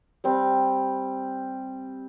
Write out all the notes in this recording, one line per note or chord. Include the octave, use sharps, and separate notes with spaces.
G3 C4